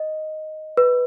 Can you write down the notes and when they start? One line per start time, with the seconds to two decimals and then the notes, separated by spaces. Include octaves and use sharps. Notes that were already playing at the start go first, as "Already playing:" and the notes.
Already playing: D#5
0.77 B4